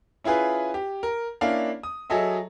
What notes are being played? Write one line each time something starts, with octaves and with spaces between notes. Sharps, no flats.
C#4 E4 F4 G#4 B4
G4
A#4
A#3 C#4 D4 E4 F5
D#6
F#3 G#4 A4 D#5 E5